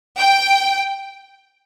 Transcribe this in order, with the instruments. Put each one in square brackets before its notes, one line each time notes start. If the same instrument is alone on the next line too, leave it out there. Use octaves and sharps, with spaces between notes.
[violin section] G5